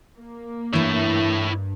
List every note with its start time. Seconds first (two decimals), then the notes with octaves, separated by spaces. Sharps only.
0.17 A#3
0.73 G2 E3 A3 E4 C#5